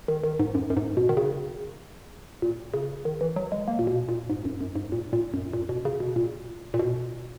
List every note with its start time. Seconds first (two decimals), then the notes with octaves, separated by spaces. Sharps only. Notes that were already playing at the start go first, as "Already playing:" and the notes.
0.08 D#3
0.24 D#3
0.39 G#2
0.55 F#2
0.70 F#2
0.77 G#2
0.97 B2
1.09 D#3
1.17 C#3
2.42 A#2
2.74 C#3
3.05 D#3
3.21 E3
3.36 F#3
3.52 G#3
3.68 A#3
3.79 A#2
3.87 B2
4.09 A#2
4.30 G#2
4.45 F#2
4.61 F#2
4.76 G#2
4.92 A#2
5.13 A#2
5.34 F#2
5.53 A#2
5.69 B2
5.85 C#3
6.00 B2
6.16 A#2
6.74 A#2
6.79 B2